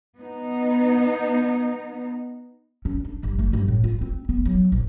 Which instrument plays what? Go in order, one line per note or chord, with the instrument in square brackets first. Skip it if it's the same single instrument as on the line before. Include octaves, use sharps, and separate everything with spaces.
[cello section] B3 D#4
[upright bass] C#4
D4
G1
A3
G1
A2
F4
C4
B3
F#3
A#1